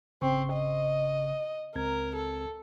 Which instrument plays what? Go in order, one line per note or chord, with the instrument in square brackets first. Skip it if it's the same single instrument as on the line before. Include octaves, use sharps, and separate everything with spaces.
[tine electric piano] G#1 C#3 C#6 [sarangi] C4
[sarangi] D#5
[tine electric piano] C#2 C4 G#6 [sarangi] A#4
[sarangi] A4